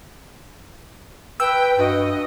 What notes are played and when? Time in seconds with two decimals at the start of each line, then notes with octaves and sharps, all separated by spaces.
1.40 B4 G5 E6
1.78 G2 F#4 D#5